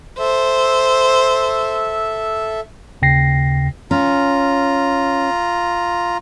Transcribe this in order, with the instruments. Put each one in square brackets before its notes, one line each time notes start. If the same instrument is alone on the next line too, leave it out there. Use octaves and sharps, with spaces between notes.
[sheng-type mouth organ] A4 E5 [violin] C5
[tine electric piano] D#2 C#3 G5 A#6 C7
[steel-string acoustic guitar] C#4 [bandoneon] F4 A#5